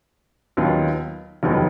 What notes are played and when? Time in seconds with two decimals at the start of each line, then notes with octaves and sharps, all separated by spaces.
0.57 D#2 D#3 F#3 B3 F4
1.43 F1 D#2 D#3 F#3 B3